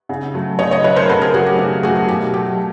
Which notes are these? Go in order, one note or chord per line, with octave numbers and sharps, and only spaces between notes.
C#3
F#3 A3
C#3 C#5 D#5
C#5 D#5
F#3 A3 B4 C#5
A#4 C5
C#3 A4 B4
G#4 A#4
F#3 A3 F#4 G#4
G4
C#3 G4
F#3 A3 F#4 G#4
B2 G4
F#3 A3 G4